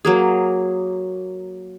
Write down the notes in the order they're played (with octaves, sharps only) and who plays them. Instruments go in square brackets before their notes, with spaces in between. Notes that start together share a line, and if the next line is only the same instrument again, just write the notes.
[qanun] F#3 A#3 G#4